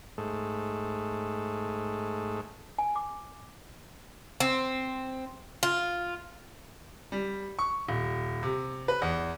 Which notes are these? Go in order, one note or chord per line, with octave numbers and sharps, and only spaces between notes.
G#2 A3
G#5
D6
C4
F4
G3
C#6
D#1
C3
B4
E2